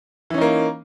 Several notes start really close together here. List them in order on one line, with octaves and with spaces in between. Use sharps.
E3 C#4 D#4 A#3